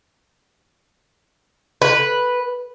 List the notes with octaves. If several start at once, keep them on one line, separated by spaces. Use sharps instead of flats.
B4